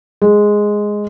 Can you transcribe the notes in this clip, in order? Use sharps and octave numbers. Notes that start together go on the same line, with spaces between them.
G#3